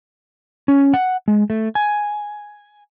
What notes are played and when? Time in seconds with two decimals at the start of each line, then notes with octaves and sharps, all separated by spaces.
0.68 C#4
0.94 F#5
1.28 G#3
1.50 A3
1.75 G#5